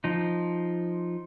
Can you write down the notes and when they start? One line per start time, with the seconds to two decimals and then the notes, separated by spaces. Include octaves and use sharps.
0.04 F3 D#4